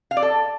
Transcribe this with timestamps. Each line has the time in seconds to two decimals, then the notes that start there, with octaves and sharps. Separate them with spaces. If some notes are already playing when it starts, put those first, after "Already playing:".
0.11 F5
0.17 D5
0.22 A4